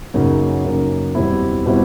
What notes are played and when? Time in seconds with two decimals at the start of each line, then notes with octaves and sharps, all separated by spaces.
0.14 F#2 C#3 F#3 A#3 D#4
0.64 F#2 C#3 F#3 A#3 D#4
1.15 E2 B2 G3 C4 E4
1.66 B2 G3 C4 E4